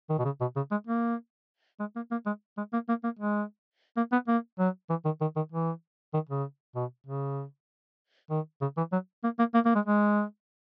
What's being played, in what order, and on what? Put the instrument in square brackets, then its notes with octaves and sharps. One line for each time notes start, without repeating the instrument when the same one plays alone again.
[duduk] D#3
B2
C#3
B2
C#3
G#3
A#3
G#3
A#3
A#3
G#3
G#3
A#3
A#3
A#3
G#3
A#3
B3
A#3
F#3
E3
D#3
D#3
D#3
E3
D#3
C#3
B2
C#3
D#3
C#3
E3
F#3
A#3
A#3
A#3
A#3
G#3
G#3